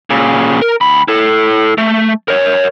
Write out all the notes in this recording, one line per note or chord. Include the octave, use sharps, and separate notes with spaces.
A#2 C#3
A#4
D2 B5
E4 A4
A3
A#4 C#5